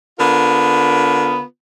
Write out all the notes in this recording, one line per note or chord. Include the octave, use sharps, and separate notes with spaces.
D3 B3 F4 A#4